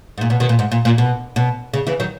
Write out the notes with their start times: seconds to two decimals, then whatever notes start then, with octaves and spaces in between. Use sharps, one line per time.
0.18 G#2
0.21 A#2
0.30 B2
0.40 B2 D#3
0.49 A#2
0.59 G#2
0.71 A#2
0.85 A#2
0.98 B2
1.36 B2
1.74 C#3
1.87 C#3 E3
2.00 D#3 F#3